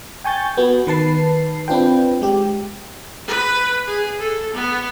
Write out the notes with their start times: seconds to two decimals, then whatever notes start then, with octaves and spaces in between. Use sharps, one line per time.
0.24 G5 G#5 C#6 G6 A6
0.57 B3 F#4
0.87 D#3 B4 A5 C7
1.68 C4 D4 F4 B4 G5
2.22 G#3 G4
3.28 B4
3.87 G#4
4.19 A4
4.54 B3